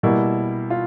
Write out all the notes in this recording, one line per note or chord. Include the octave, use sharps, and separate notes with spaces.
B2 G3 A#3 E4
F4